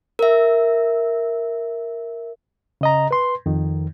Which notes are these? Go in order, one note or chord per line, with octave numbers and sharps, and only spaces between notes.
A#4 E5
C#3 D#5 A#5
B4 C6
F2 D#3